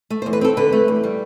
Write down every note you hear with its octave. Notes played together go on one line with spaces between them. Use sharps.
A3
C5
E2
B4
C4 A4
D3 B4
A3
E2
G3